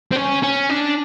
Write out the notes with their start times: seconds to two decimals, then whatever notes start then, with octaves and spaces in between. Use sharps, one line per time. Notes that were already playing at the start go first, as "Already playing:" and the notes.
0.12 C4
0.16 C#4
0.43 C#4
0.70 D4